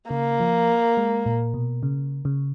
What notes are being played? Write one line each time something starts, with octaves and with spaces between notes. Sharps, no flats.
C#3 A#3
F3
G#3
A#2
B2
C#3
C#3